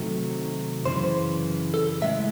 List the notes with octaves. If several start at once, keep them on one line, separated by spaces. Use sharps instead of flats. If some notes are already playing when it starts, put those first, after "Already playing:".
Already playing: C3 D#3 F#3 A3
F#2 C#3 E3 C5
A4
A2 G#3 E5